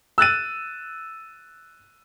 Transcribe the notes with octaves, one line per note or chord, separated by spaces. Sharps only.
E6 F#6 A6 D#7